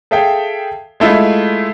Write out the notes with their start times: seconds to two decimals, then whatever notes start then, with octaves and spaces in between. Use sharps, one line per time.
0.11 G#4 A4 E5 F5 G5
1.00 G#3 A3 E4 F4